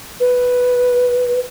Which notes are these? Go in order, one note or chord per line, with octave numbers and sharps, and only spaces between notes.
B4